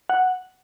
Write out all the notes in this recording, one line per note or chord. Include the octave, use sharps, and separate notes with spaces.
F#5